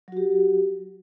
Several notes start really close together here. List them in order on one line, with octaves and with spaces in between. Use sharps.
F#3 F#4 G4